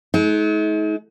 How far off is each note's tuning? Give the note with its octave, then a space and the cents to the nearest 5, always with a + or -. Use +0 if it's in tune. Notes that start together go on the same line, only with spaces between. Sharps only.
G#3 +45 D#4 +45